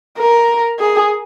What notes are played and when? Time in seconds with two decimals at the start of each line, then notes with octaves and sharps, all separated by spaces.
0.18 A#4
0.79 G#4